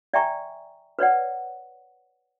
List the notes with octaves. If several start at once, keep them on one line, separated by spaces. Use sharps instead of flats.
D5 E5 G5 G#5 A#5 C#6
B4 C#5 D5 F#5